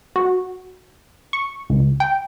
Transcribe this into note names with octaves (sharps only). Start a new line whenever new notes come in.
F#4
C#6
C#2
G5